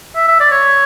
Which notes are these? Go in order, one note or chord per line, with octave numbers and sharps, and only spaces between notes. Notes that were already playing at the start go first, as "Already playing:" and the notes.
E5
E5
D5
C#5